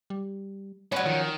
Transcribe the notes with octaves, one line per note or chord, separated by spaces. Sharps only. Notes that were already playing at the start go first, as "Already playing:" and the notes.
G3
G#2 F#3 C#4 B4
D#3 F3